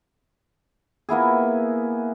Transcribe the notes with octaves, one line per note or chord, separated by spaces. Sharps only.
A#3 B3 E4 G#4